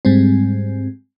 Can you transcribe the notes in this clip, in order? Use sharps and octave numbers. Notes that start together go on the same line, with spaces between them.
G#2 G3 G#3 C4